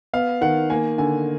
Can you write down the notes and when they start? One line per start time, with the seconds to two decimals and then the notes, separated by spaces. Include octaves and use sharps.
0.13 B3 F5
0.41 D#3 F#5
0.70 A#3 G#5
0.98 D3 G#5